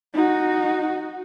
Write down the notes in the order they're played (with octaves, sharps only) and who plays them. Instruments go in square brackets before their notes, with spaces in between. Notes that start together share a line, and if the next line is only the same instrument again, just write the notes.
[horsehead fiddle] D#4 F#4